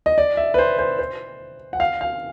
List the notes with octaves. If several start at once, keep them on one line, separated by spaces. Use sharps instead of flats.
D#5
D5
E5
B4
C5
C5
C5
F#5
F5
F5